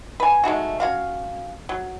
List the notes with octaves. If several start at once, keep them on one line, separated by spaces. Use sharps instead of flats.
B4 G#5
G#3 A3 D#4 F#4
C#4 F#4 F5
F#3